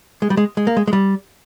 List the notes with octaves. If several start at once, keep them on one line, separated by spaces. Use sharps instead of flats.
G#3
G3
G#3
G#3
A#3
G#3
G#3
G3